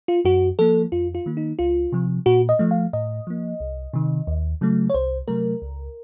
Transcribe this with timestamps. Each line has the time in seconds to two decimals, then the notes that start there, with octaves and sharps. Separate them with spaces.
0.08 F4
0.25 F#2 F#4
0.59 F3 A#3 A4
0.92 F2 F4
1.15 F4
1.26 D#3 A#3
1.37 D#4
1.59 C#2 F4
1.92 C3 F3
2.26 A#2 F#4
2.49 D#5
2.59 F3 A3
2.71 F5
2.93 A2 D#5
3.27 F3 A#3
3.60 C2
3.93 C3 D#3
4.27 D#2
4.61 C#3 F#3 A3
4.90 C#5
4.94 C2 C5
5.28 C3 F#3 A3 A#4
5.62 C#2